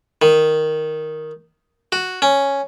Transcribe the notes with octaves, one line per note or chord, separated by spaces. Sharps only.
D#3
F#4
C#4